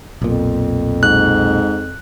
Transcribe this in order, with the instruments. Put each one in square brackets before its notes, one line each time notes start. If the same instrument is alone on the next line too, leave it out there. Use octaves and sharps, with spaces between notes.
[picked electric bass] B1 A#2 [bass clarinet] F2
[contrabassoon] G#2 [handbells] F#6